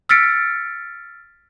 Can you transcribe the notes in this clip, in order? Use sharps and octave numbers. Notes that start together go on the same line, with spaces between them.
E6 F6 A6 B6 C#7 D7